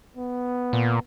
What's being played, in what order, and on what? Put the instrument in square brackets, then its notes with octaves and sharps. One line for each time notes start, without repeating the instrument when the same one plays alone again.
[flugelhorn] B3
[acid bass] A#2